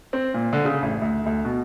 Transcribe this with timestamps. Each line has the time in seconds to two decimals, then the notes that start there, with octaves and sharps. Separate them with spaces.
0.13 C4
0.34 A#2
0.53 D3
0.65 C#3
0.82 A1
1.02 D2
1.26 D2
1.45 B2